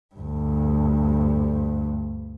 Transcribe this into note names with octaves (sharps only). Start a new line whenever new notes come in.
D2 G2